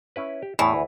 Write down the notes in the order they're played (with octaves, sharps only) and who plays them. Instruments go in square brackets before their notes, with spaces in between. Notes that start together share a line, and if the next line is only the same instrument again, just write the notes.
[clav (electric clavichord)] C#4 E4 B4
G4
[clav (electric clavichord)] E2 A2 [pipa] E3
[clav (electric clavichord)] D2